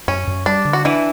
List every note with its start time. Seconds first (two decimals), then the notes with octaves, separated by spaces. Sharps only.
0.08 F#2 C#4
0.27 F#2
0.46 G3 D4
0.65 D3
0.73 F#4
0.85 E3 D4 E4